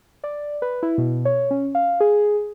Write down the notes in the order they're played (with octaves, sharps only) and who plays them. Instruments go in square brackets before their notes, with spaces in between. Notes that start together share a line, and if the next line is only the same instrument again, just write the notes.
[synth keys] D5
B4
E4
B2
C#5
C#4
F5
G#4